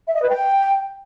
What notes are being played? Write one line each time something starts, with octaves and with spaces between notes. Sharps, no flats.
E5
D#5
B4
G5